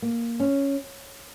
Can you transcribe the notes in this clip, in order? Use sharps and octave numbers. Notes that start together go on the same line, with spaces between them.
A#3
C#4